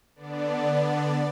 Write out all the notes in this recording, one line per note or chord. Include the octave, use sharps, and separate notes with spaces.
D3 B3 D4 D5